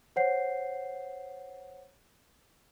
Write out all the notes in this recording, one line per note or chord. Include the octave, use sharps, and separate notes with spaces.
C5 C#5 F#5 G6 C7